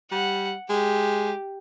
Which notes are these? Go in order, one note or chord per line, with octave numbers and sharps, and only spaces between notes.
G3 F#5
G#3 G4